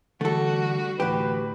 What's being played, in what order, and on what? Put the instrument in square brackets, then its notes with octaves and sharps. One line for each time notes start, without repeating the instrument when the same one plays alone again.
[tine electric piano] D3 E3 [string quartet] G3 F#4 [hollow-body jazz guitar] A3 A4
[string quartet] D2 A2 [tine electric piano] E3 [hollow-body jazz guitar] F#4 G4 [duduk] B4